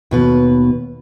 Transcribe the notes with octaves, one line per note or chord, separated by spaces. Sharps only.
D#2 B2 B4